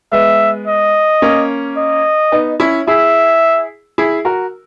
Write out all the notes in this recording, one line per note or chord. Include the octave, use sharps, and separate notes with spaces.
G#3 B3 E5
D#5
A#3 C#4
D#5
B3 D#4
C#4 E4
E4 G#4 E5
E4 G#4
F#4 A#4